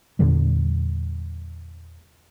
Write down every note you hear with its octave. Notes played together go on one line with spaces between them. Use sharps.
E2 A#2 D3 G3